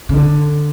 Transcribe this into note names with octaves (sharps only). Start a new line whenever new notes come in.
C#3
D3